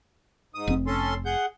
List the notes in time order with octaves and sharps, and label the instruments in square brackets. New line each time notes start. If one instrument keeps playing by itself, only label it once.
[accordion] G#2 D#6
[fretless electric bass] F1 C4
[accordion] C#4 A4 C6
G#4 F#5 G6